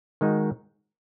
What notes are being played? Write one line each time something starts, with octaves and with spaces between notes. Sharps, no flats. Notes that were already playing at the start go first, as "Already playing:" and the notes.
D#3 G#3 D#4 F#4